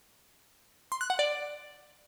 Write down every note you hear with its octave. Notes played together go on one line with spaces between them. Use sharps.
C6
F#6
F#5
D5